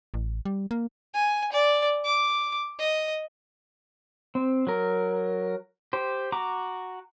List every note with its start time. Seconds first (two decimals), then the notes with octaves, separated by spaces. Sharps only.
0.14 A1
0.45 G3
0.71 A#3
1.14 G#5
1.52 D5
2.05 D6
2.79 D#5
4.35 C4
4.67 F#3 A#4
5.93 G4 C5
6.32 F#4 A#5 D6